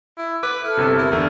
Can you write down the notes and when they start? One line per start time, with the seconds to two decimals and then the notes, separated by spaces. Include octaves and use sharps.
0.17 E4
0.43 B4 D6
0.64 E4 A4 F6
0.77 G1 C3
0.98 E4 A#4
1.12 E2 A3 D4